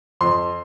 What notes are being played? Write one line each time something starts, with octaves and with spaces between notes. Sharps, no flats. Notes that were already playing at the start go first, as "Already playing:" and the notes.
F2 C6